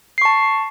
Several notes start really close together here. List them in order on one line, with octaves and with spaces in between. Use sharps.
C7 C#6 A5